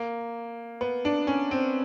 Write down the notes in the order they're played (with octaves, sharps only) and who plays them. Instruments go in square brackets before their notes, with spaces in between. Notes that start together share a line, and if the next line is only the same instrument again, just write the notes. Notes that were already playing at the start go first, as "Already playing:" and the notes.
Already playing: [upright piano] A#3
B3
D4
C#4
C4